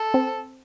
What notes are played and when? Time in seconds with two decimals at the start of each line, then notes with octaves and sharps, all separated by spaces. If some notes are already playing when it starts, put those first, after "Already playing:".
Already playing: A4
0.14 C4